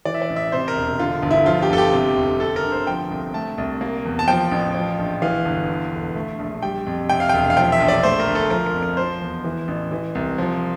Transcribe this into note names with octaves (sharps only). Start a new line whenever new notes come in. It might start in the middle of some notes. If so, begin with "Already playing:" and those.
E3 D5
E5
D5
A1
E5
C3 C5
A#4
E1
D3 F4
G1
E4
F3 F4
G4
G1 A4
G4
C3
F1
D3 A4
A#4
G1
C5
F3 G5
C2
A3 A5
C2
A#3
E2
A5
F3 G5
A1
F3
A#1
E3 F5
G1
D3
E1
A3
A#1
G3 G5
F2
C3 G5
F5
E1 G5
F5
F3 G5
E5
A#1
D5
A3 C5
A#4
D2
A4
F3 A#4
A#4
F2
A#4
F3 C5
E2
E3
A1
E3
C2
F3